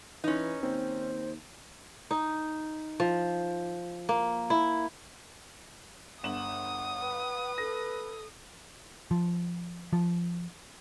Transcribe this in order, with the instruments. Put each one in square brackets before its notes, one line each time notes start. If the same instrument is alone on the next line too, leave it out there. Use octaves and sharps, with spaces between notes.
[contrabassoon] E3 [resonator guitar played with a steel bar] C#4 D#4 [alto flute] B4
[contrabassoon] D#2 [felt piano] C4 [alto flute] C5
[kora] D#4
F3
A#3
E4
[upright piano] G1 E7 F#7 [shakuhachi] F#5 [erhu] D#6
[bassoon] B4
[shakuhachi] A4 [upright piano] A#6
[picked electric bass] F3
F3